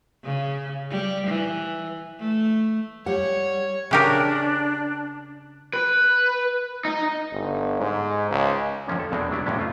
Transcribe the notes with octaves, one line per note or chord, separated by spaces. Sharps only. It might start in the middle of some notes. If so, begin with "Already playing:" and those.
C#3
G3
E3
A3
G3 C#5 F#5
C#3 D4 G4 A#4
B4
D#4
G1
G#2
C#2
F2 D3 F3 A#3 C#4
A4
E2 B2 G#3 A#3 C4 D4
F#3 G3 B3 D4 E4
F2 A2 C3 C#4 D4
A3 F4